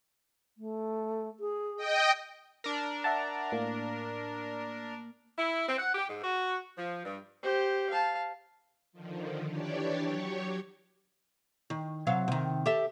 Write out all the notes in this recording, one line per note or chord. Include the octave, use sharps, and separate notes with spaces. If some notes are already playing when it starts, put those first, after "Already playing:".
A3
G#4
D#5 G5
D4 A#4
E5 F#5 A5
A2 A#3
E4
C4
F#5
G4
G#2
F#4
F3
G2
G4 C5
F5 A5
D3 D#3 F3
E3 D4 G4 C#5 D5
F#3 G4 C#5 C#6
D#3
C3 F#3 F5
C3 D#3
G4 A4 E5